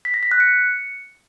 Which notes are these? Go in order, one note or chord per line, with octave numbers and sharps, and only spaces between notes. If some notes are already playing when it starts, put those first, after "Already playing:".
B6
A#6
B6
F#6
C#7